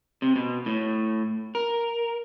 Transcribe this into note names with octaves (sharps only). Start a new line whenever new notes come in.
C3
B2
A2
A#4